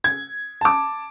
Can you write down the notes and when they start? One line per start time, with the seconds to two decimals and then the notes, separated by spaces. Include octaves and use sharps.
0.04 G#6
0.61 A5 D6